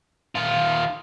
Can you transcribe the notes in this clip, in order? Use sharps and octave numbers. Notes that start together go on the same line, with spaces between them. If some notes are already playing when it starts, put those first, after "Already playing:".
D#3 F4